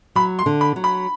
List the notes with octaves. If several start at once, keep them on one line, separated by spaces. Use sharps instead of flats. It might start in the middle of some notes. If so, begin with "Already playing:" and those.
F#3 B5
C6
D3
B5
F#3
B5